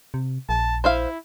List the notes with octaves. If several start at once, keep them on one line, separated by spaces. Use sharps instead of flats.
C3
A#1 A5
E4 C5 E5 F5